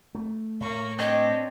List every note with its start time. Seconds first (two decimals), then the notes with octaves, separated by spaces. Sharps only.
0.15 A3
0.61 A2 A#3 C#6
0.99 G#3 C4 D4 C#5 D#5